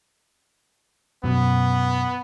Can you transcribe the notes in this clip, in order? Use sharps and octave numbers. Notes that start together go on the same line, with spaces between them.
F#2 B2 B3